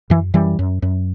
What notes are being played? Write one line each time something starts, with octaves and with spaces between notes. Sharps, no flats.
F#2 E3
F#2 E3 G3
F#2
F#2